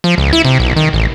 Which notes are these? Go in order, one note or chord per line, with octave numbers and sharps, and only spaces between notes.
F3
C#2
E4
C3
B1
D#3
A1